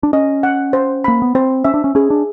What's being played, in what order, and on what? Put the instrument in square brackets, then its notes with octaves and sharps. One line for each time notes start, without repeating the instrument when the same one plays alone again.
[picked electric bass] D4
[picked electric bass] C#4 [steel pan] D#5
[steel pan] F#5
C5
[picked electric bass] A#3 [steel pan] B5
[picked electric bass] B3
[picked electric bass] C4 [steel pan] C5
[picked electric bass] C#4 [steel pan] E5
[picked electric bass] D4
C#4
[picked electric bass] C#4 [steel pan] G#4
[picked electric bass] D4